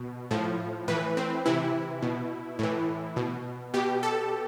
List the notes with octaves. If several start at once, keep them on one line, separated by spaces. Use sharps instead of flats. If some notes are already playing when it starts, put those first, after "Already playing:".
Already playing: B2
A2 F3
A2 E3 B4
C4
C3 E3 E4
B2
A2 E3
B2
B2 G4
A4